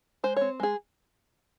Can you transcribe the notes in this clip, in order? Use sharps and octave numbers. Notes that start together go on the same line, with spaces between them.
G#3 C5
C4 C#5
G#3 G#4